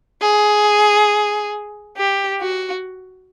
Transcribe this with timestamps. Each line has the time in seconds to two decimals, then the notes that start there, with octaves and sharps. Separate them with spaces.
0.22 G#4
1.97 G4
2.41 F#4